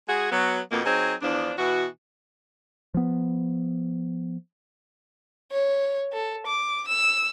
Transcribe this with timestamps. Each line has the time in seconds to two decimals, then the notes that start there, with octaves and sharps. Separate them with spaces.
0.09 G#3 F#4 G#4
0.32 F#3 B3
0.72 F2 B2 A#3
0.85 F#3 C4 D#4 G#4
1.22 E2 F3 D4
1.58 B2 E3 F#4
2.94 F3 B3
5.52 C#5
6.13 A4
6.46 D6
6.88 E6